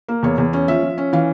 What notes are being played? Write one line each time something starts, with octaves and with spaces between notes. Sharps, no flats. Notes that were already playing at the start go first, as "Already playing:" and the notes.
A#3
E2 C#5
E2
C#4
F3 E5
F3
C#4
E3 F5